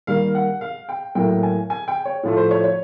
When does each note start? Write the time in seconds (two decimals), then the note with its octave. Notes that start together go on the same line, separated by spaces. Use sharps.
0.07 D#3 G3 A#3 F5
0.35 F#5
0.61 F5
0.89 G5
1.15 A2 F#3 A#3 G5
1.43 G#5
1.70 G#5
1.88 G5
2.05 C#5
2.23 A2 F3 A3
2.37 C5
2.51 C#5
2.64 C#5